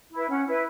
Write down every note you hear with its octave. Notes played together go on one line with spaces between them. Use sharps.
E4 B4
C#4 F#5
E4 B4